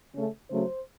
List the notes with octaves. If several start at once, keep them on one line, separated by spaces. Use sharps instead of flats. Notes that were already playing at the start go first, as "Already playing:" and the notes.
C#3 A3 C#4
C#3 F#3 A3 C5